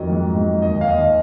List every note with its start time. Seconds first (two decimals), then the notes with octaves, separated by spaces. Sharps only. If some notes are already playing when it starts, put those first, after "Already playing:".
Already playing: F2 D#3 F#3 D#5
0.10 G#2
0.35 G#2
0.62 D#2 D#5
0.81 F5
0.88 D#2 D#5